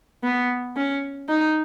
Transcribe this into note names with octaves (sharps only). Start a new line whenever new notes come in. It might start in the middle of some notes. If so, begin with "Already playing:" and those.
B3
C#4
D#4